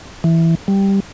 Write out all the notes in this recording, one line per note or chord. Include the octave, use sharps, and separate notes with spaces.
E3
G3